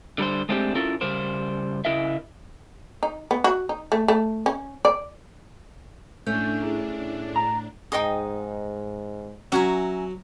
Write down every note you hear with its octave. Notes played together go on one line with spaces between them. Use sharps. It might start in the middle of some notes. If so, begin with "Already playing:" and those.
D3 G3 A#4 C5
G#3 A3 C4 D4 D#4 G4
C#4 E4 F4 A4 A#4
C#3 G3 A#4 C5
C#3 E4 A#4 D#5 E5
D#4
B3
F#4
D#4
A3
A3
C#4
D5
A2 A3 C#4 D4 G6
E4 G#4
A#5
G#2 D#4 G#4 D#5 G5 D#6
F#3 C#4 F#4 E5 G#5 A#5